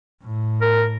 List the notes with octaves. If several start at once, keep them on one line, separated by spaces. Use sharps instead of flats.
A2
A#4